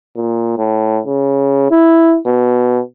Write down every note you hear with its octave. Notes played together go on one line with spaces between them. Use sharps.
A#2
A2
C#3
E4
B2